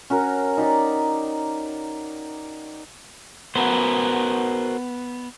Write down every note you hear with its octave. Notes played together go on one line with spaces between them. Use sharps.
C#4 F#4 A#4
D#4 G4 D5
B3 F#4 A#4 C5